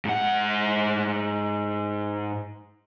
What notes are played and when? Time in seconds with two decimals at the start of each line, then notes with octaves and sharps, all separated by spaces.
0.05 G#2 F#5